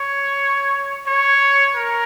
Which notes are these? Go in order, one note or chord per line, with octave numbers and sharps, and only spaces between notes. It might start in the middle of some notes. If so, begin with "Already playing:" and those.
Already playing: C#5
C#5
A#4